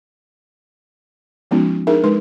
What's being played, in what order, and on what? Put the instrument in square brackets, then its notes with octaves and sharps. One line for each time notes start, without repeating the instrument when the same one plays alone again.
[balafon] F3 G#3 B3 C#4 D#4 F#4
D4 D#4 G#4 A#4 E5
G#3 D#4 B4 C6